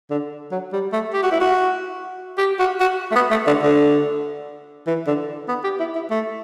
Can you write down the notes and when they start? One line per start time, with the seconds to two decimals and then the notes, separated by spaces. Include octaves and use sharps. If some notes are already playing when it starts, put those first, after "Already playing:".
0.11 D3
0.51 F#3
0.73 G3
0.93 A3
1.13 G4
1.23 F#4
1.31 E4
1.40 F#4
2.38 G4
2.59 F#4
2.80 F#4
3.11 A3
3.15 B3
3.31 A3
3.47 D3
3.63 D3
4.87 E3
5.07 D3
5.49 B3
5.64 G4
5.80 E4
5.95 E4
6.11 A3